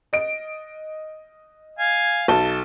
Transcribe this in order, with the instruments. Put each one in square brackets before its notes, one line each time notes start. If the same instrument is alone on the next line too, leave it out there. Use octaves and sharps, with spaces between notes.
[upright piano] D#5 D7
[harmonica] F5 G#5
[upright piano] B1 A5 G7 [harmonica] A4